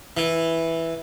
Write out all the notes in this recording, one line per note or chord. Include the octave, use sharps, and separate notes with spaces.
E3